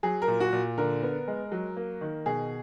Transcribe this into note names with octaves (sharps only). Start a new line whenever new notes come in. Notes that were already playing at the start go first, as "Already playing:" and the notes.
F#3 G#4
A#4
A#2
F#4
A#2
D3 A#4
B3
G#3
F#3
A#3
D#3
B2 G#4